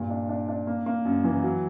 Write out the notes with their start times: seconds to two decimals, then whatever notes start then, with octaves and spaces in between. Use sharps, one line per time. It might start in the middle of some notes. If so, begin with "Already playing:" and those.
Already playing: G2 A#2
0.10 D4
0.29 D4
0.49 D4
0.67 A#3
0.86 A#3
1.05 F#2
1.24 E3
1.44 F#3